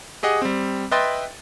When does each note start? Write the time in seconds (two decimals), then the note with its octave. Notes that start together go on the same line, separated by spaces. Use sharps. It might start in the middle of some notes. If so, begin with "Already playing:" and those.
0.23 G4 G#4 D#5 F#5
0.42 G3 C4
0.91 B4 D#5 E5 G5 C6 A6